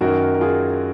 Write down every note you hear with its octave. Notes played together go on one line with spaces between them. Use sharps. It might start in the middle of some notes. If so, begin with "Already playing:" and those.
F#2 D#3 F#4 A#4
A#4
F4 G#4